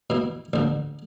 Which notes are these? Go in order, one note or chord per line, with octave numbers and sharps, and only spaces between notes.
B2 E3
A1 D2